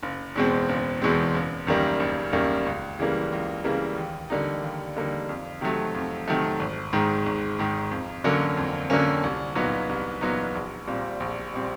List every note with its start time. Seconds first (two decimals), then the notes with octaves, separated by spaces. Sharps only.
0.03 F#1
0.36 E2 B2 G#3 C4
0.69 F#1
1.02 E2 B2 G#3 C4
1.35 F#1
1.67 F#2 D#3 G3 A#3
2.00 F#1
2.33 F#2 D#3 G3 A#3
2.66 C#2
2.99 C#3 E3 G3 A#3
3.32 C#2
3.64 C#3 E3 G3 A#3
3.98 D#2
4.30 D3 G3 A#3 D#4
4.62 D#2
4.96 D3 G3 A#3 D#4
5.29 F2
5.61 C3 D#3 F#3 A3
5.95 F2
6.28 C3 D#3 F#3 A3
6.60 G#1
6.93 G#2 D#3
7.26 G#1
7.59 G#2 D#3
7.91 F2
8.24 D3 F#3 A#3 C#4
8.57 F2
8.90 D3 F#3 A#3 C#4
9.24 C2
9.55 A#2 F#3 B3 D#4
9.89 C2
10.21 A#2 F#3 B3 D#4
10.55 A#1
10.87 A#2 G3 C4
11.20 A#1
11.53 A#2 G3 C4